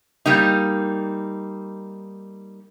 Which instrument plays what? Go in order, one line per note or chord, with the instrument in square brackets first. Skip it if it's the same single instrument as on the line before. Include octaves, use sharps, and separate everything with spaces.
[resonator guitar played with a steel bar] G3 A#3 D#4